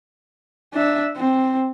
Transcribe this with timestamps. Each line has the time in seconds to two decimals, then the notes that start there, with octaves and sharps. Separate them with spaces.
0.73 D4 E5
1.17 C4